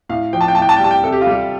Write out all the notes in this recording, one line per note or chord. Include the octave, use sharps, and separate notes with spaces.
A2 F5
F3 G5
A5
G5
A2 A5
G5
A5
G5
G3 A5
G5
C3 A4
G4
F4
G3 G4